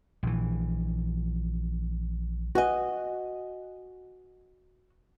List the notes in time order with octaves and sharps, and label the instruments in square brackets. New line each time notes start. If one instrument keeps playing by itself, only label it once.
[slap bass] A#1 E3
[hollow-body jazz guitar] F#4 D#5 [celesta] B4 F#5 G#5